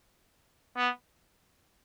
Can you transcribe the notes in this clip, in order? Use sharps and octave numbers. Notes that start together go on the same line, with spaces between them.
B3